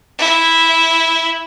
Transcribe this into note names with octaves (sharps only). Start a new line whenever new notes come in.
E4